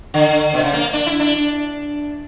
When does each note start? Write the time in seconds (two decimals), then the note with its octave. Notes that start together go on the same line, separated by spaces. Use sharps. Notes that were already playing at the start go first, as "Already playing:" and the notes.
0.14 D3
0.53 B2
0.63 C#3
0.73 A#3
0.93 D4
1.07 E4
1.20 D4